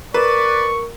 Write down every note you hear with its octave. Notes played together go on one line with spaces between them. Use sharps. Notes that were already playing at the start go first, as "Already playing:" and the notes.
A#4 B4 D5 C#6